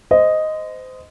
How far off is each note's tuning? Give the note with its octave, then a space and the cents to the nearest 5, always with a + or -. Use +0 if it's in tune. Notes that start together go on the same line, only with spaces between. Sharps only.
C5 -25 D#5 +0